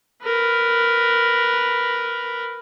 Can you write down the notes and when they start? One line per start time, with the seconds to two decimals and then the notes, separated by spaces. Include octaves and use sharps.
0.23 A#4 B4